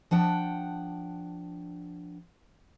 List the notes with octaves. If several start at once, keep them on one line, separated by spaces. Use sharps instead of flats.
F3 D4 F#5 G5